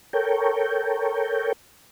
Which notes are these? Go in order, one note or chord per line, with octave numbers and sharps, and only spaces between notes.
A4 A#4 C#5 G5